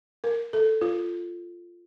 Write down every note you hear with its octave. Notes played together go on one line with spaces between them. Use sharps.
A#4
A4
F4